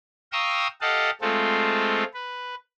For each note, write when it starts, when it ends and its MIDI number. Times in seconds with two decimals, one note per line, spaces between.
0.32 0.67 77
0.32 0.67 79
0.32 0.67 82
0.32 0.67 85
0.32 0.67 87
0.32 0.67 88
0.81 1.10 67
0.81 1.10 69
0.81 1.10 75
0.81 1.10 77
0.81 1.10 78
0.81 1.10 81
1.21 2.04 56
1.21 2.04 57
1.21 2.04 60
1.21 2.04 65
1.21 2.04 69
2.14 2.55 71